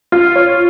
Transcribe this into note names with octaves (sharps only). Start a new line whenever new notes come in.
F4
C#5